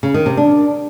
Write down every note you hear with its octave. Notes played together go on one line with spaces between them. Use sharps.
C#3
D#3
C3
D4